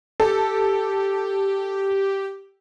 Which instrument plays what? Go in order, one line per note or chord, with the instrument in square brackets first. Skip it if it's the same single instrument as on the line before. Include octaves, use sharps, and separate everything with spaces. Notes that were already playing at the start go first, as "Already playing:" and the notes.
[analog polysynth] G4 [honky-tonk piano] A4